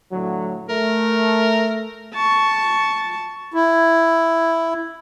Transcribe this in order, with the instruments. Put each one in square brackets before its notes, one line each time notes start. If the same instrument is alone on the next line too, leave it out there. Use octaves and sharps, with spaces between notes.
[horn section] A2 D3 F#3
[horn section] A3 [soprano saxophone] A#4
[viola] A5 C#6
[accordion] E4